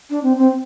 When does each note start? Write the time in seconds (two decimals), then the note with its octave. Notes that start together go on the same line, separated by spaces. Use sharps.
0.10 D4
0.23 C4
0.38 C4